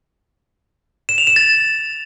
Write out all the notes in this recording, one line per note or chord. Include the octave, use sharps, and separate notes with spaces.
E7
F7
E7
A6